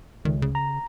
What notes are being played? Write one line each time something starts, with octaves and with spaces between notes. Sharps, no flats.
C#2 D#3
C#3
A#5